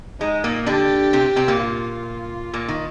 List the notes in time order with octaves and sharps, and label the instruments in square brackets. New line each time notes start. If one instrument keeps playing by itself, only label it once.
[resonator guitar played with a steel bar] G#3 [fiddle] D#4
[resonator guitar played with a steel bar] A#2 A#3
[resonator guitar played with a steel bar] D3 D4 [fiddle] G4
[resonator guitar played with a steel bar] C3 C4
C3 C4
A#2 A#3
[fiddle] F4
[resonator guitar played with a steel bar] A#2 A#3
D#3